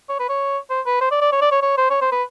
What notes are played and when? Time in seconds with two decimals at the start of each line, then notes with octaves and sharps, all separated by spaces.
0.09 C#5
0.20 B4
0.29 C#5
0.70 C5
0.86 B4
1.01 C5
1.11 D5
1.21 D5
1.32 C#5
1.41 D5
1.51 C#5
1.62 C#5
1.77 C5
1.90 C#5
2.01 C5
2.12 B4